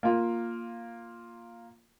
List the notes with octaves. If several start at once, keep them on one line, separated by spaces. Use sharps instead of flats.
A#3 F4